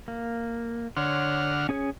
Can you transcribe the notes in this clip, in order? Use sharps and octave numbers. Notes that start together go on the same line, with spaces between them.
A#3
D3 C#5 F#5 C6 F6
C#4 G#4 C#5